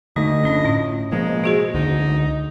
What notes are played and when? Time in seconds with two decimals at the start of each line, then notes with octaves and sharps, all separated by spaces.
0.16 D3 A3 D#4 D#5
0.44 F#1 C#4 D4 E4 B5
0.65 A2 C#4 F4
1.12 B2 F3 G#3 A#3
1.44 F#4 G#4 C5
1.74 C#2 D3 D#4